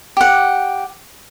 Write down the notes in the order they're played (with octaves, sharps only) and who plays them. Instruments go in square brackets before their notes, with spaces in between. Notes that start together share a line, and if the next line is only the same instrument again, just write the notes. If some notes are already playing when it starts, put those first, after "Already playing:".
[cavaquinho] G4 F#5